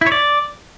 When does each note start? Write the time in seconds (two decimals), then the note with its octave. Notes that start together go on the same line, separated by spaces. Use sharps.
0.01 E4
0.07 C#5
0.12 D5